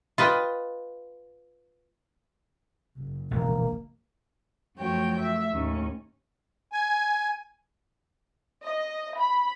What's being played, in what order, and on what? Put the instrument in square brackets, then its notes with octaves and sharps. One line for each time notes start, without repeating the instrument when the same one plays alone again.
[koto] F4 B4 D#5 G5
[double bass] F#1
[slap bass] E1 A#1 [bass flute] A#3
[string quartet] F#2 F3 A3 F#4 C#5 G5
A3 E5
D#2 A2 C#4
[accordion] G#5
[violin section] D#5
B5